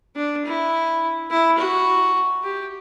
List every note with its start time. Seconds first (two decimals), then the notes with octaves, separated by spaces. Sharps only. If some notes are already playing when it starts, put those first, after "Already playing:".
0.16 D4
0.45 E4
1.30 E4
1.58 F#4
2.43 G4